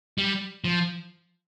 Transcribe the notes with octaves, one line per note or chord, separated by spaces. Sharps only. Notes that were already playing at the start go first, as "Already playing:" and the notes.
G3
F3